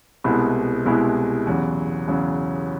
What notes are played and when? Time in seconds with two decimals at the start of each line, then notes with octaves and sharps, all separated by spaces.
0.24 C2 B2 G#3 B3 E4
0.85 C2 B2 G#3 B3 E4
1.47 E2 C#3 F#3
2.07 E2 C#3 F#3